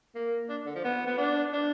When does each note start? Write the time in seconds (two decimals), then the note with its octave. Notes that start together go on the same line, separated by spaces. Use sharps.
0.15 A#3
0.49 D4
0.66 D3
0.75 F3
0.84 B3
1.06 B3
1.18 D4
1.53 D4